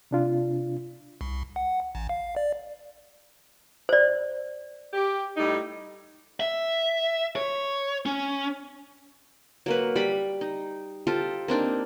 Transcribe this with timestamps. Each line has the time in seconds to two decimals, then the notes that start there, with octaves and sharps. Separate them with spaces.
0.11 C3 D4 F4
1.21 C2
1.56 F#5
1.95 A1
2.09 F5
2.36 D5
3.89 C5 D5
4.93 G4
5.37 A2 G3 D#4
6.40 E5
7.36 C#5
8.06 C#4
9.66 F#3 A#3 B4
9.96 G3 B5
10.41 D#4
11.07 F4 G4 A4 C5
11.48 A#3 C4 D4 D#4